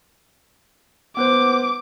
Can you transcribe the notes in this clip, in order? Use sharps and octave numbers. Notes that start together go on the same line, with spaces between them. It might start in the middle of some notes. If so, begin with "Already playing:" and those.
B3 B4 C5 D6